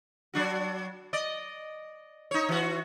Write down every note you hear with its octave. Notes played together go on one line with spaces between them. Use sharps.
F#3 D4 F#4
D5 D#5
D#4 C#5
E3 F#4